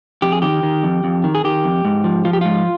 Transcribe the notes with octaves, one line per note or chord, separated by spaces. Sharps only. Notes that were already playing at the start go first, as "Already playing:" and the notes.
F2 G4
G#4
D#3 G4
D#3
F2
F2
D#3
G#4
D#3 G4
F2
G#2
F3
F3 F4
G4
G#2 F4